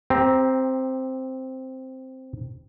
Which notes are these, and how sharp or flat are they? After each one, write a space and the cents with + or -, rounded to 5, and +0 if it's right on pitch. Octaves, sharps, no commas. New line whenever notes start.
C4 +0 G4 +25 A#5 +10